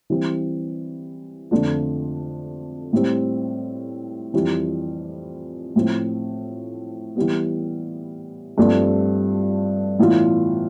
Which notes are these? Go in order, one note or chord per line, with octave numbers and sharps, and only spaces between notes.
E3 G3 C4
F2 D3 A3 D4 F4
A2 G3 C4
F2 E3 G3
A2 F3 C4
E3 G3 B3
G2 F3 A3 C4
A2 E3 B3 F4